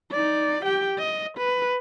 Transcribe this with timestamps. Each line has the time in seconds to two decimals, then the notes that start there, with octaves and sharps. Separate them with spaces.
0.11 D#4 D5
0.64 G4 G5
0.98 D#5
1.37 B4